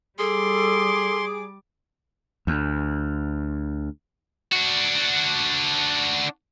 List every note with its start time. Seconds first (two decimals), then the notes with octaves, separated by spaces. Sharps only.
0.19 G3 G#4 A4 C6 D6
2.47 D2
4.53 D4 F#4